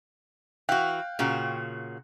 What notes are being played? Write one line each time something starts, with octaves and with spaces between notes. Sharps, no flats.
E3 F#4 F5 G5 F#6
A#2 C#3 F#4